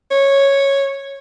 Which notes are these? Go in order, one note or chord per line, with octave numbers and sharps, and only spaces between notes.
C#5